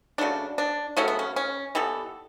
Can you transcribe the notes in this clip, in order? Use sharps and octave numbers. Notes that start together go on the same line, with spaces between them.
C#3 F#3 A3 D4
D4
C#3 F#3 A3 C#4
B3
C#4
C#4
E3 G3 B3 A4